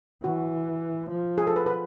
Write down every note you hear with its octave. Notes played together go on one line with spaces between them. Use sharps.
E3 F#4
F3
G#4
A4
B4
B4